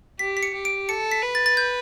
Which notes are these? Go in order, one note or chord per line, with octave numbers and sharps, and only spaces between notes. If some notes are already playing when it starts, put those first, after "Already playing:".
G4 B6
B6
C#7
G4
D7
A4 C#7
B6
B4
A6
A6
G6